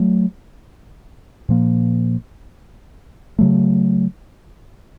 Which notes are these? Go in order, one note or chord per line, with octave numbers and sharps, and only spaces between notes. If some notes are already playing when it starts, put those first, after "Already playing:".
Already playing: F#3 A3
A#2 F3 A#3
C#3 F#3 A3